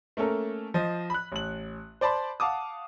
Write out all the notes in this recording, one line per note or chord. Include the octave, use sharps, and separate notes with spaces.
A3 A#3 C#4 A4 A#4
F3 C5 D#5
B5 F#6
A1 F#7
C5 D5 A5 B5 C6
F5 F#5 A5 D6 D#6